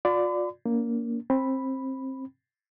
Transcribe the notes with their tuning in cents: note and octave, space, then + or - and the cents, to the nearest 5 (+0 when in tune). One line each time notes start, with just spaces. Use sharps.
F4 +40 D5 +0 B5 +45
A#3 +0 D4 -45
C4 +20 B5 +0